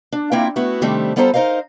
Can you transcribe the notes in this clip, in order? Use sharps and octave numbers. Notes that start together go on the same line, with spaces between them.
D4
A#3 C4 E4 F4 G5
A3 B3 E4 F#4
C3 D#3 G3 A3 C4 D4
G3 B3 F4 A4 C5 A#5
D#4 A#4 C5 D#5 F5